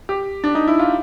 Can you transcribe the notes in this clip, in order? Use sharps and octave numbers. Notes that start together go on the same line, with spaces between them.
G4
D4
D#4
E4
F4